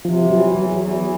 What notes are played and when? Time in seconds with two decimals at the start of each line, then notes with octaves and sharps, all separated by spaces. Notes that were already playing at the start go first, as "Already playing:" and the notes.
0.05 C3 F3
0.30 E3 F#3
0.55 E2 F#3
0.80 E3